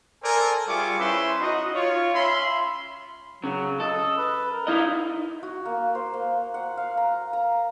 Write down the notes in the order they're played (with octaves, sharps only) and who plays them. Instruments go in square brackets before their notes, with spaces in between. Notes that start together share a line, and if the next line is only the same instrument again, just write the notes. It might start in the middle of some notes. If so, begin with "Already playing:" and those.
[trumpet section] A4 A#4 C5 D5 G#5
G3 F4 G#4 E5 C#6 D6
C#4 E4 B4 C5 E5 C6
D#4 F#4 D#5
F4 C#5
C#4 E5 F5 B5 C6
[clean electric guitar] C#3 [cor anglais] F#3
[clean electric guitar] A4 [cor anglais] D#5
[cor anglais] B4
A#4
[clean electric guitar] D#4 E4 D#5 [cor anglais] F5
[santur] F#4
A#3
C5
A#3
F#5
F5
A#5
A#5